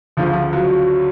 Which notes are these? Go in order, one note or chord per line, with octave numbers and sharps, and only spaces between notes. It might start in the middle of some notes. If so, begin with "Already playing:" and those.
D2 C#3 F3
F3
F#3